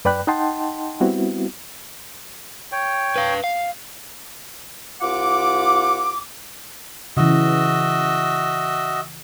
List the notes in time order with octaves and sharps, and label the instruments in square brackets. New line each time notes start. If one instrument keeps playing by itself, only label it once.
[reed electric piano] F#2 B4 D5 G5 B5 F#6
D#4 D#5 F#5 G5 A5 C6
G3 B3 C4 E4 F#4
[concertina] C#5 G5
[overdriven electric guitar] B4 F5
F5
[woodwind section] C2 F4 F#5 D6
[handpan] C#3 E3 [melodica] F#4 D#5 E5